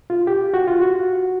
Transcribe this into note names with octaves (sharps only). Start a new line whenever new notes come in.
F4
G4
F#4
F4
F#4